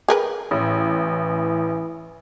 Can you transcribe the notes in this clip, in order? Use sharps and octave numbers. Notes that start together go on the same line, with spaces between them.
G#4 A#4 B4
A1 E3